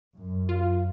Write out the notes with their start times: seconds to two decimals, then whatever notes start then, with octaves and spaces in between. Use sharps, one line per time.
0.15 F#2
0.49 F4